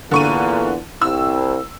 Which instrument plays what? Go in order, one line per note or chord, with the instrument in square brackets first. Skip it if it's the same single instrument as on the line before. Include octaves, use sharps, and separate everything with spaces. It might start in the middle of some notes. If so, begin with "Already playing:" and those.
[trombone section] E2 A#2 [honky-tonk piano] D3 C#6 D#7
[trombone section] C2 C3 [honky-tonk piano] E6